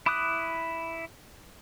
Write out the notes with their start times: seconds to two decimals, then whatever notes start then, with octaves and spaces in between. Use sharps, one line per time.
0.06 E4 B5 D6 D#6 F#6